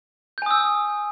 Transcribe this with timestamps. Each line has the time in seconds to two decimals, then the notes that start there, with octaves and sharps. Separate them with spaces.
0.38 G6
0.42 G#5
0.46 D#6
0.51 E6